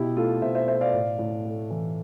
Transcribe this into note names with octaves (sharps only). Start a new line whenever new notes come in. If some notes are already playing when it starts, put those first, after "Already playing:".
Already playing: B2 E4 G4
A3 F4 A4
B2 C5 E5
C5 E5
A3 C5 E5
D5 F5
A2
A2
A3
E3